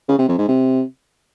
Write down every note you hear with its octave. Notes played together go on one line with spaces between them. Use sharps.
C#3
C3
F2
G#2
C3